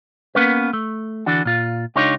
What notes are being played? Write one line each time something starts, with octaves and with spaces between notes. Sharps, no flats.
A#3 B3 C#4 A#4 B4
A3
D3 E3 D4 F#4
A#2 F4
C#2 D4 D#4 F4 G4 C#5